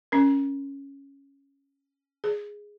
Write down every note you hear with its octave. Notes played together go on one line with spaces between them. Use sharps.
C#4 A#4
G#4